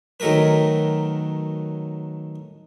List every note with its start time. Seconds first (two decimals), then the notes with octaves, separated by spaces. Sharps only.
0.20 D#3 F#3 A3 A#4 B4